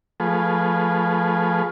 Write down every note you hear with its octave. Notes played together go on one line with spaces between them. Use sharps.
F3 A3 G#4 B4